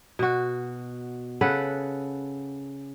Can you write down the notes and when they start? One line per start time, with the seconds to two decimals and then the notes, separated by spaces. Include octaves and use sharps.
0.19 B2 F#4
1.41 C#3 A4 B4 F#5